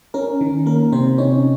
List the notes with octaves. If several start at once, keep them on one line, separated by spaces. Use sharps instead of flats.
C#4 A#4
D#3
A#3 A#4
C3 C4 C5
C#4 D#4 C#5